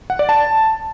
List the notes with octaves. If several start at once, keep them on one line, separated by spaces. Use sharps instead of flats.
F#5
D5
A5